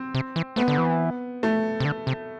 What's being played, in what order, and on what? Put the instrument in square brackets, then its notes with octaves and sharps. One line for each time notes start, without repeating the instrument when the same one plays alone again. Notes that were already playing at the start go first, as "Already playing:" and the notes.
Already playing: [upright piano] C4
[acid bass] C3
E3
[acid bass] A3 [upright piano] B3
[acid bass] D3
E3
[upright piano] A3
[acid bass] C3
D3
C3